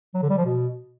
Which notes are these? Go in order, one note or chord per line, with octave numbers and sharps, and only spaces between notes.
F#3
D3
G3
F3
B2